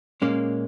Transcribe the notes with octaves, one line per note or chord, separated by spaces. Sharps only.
A#2 G#3 A#3 C#4